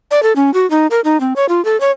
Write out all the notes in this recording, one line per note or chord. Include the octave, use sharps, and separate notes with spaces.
D5
A4
C#4
F#4
D#4
A#4
D#4
C4
C#5
F4
A4
C#5